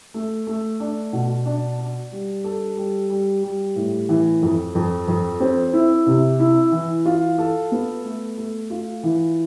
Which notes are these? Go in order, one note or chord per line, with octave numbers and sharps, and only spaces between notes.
A3
A3
D4
B2
D4
D4
G3
A4
G3
G3
G3
A2
E3
F2
F2
F2
C4
E4
C3
E4
E3
F4
A4
B3
A3
A3
F4
E3